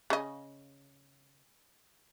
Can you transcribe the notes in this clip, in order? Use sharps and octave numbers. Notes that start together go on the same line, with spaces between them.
C#3 D#5